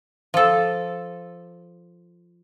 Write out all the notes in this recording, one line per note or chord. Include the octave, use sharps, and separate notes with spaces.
F3 A4